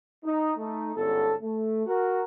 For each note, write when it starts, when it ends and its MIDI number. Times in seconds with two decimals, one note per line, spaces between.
0.24 0.52 63
0.57 0.91 57
0.57 0.91 63
0.96 1.34 31
0.96 1.34 44
0.96 1.34 50
0.96 1.34 59
0.96 1.34 61
0.96 1.34 69
1.42 1.84 57
1.86 2.24 66
1.86 2.24 70